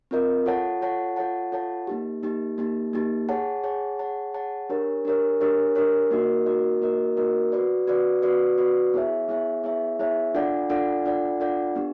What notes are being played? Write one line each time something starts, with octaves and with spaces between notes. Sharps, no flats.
C4 F4 A#4 D#5
F4 A4 C#5 F#5 A5
F4 A4 C#5 F#5 A5
F4 A4 C#5 F#5 A5
F4 A4 C#5 F#5 A5
A#3 D#4 G4
A#3 D#4 G4
A#3 D#4 G4
A#3 D#4 G4
G#4 C#5 F#5 A5
G#4 C#5 F#5 A5
G#4 C#5 F#5 A5
G#4 C#5 F#5 A5
D4 G4 A#4 C#5
D4 G4 A#4 C#5
D4 G4 A#4 C#5
D4 G4 A#4 C#5
A#3 D#4 F#4 A#4 D#5
A#3 D#4 F#4 A#4 D#5
A#3 D#4 F#4 A#4 D#5
A#3 D#4 F#4 A#4 D#5
F#4 B4 D5
F#4 B4 D5
F#4 B4 D5
F#4 B4 D5
B3 E4 G#4 C#5 E5
B3 E4 G#4 C#5 E5
B3 E4 G#4 C#5 E5
B3 E4 G#4 C#5 E5
D4 F4 A4 D5 F#5
D4 F4 A4 D5 F#5
D4 F4 A4 D5 F#5
D4 F4 A4 D5 F#5
B3 D4 G4